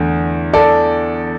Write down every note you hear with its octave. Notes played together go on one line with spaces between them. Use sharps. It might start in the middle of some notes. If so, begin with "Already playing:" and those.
Already playing: E2 D3 A3
A4 D5